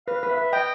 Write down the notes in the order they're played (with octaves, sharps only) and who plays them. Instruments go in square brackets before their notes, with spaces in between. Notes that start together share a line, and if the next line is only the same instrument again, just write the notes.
[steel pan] B4 [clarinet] F5
[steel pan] B4
[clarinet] E5
[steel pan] B4
[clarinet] D#5 [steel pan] G5